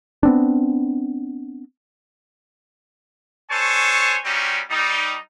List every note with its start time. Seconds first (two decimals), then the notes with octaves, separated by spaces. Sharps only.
0.23 B3 C4 D4
3.50 D4 A4 C5 C#5 G#5 C#6
4.24 G3 C4 C#4 D#4 F#4 G4
4.70 G3 D#4